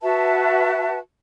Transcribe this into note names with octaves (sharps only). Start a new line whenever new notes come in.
F#4 B4 E5 A5